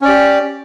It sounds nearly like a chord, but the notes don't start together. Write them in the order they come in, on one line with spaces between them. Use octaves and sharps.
C#4 D5 G4